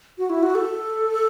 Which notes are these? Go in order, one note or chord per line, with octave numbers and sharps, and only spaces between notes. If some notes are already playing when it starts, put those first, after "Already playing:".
F#4
E4
F#4
A4